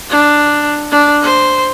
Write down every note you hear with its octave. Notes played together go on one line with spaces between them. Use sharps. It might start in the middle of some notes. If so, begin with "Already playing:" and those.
D4
D4
C5